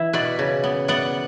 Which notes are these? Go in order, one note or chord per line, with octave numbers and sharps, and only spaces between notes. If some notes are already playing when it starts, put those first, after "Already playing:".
Already playing: E3 E4 E5
B2 B4 D5
C#3
B3
B3 D5 F#5